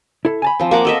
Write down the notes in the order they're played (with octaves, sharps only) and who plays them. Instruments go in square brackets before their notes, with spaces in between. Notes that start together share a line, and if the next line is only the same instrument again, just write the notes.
[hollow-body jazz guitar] E4 A4
G#5 A5 B5
[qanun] F3 C4
A#3 F#5 D6
A4 D#5 E5